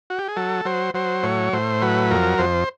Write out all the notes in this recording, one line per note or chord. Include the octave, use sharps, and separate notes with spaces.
F#4
G4
G#4
F#3 A4
F#3 C5
F#3 C5
A2 C#5
A2 C5
F#3 B4
F2 A#4
F2 C5